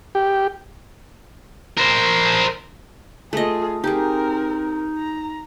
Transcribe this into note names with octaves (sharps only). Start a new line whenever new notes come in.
G4
A#4 C5
A3 F4 G#4 D#5
C4 D#4 G4 G#4 A#4
A#5